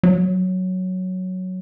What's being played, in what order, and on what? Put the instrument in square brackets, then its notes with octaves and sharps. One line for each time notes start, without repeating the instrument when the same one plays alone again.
[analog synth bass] F#3